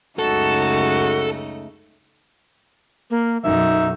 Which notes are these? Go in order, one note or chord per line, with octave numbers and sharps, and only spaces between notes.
C#2 F#2 C#3 A3 D#4 F#4 A4
A#3
B1 F#2 D#4 E5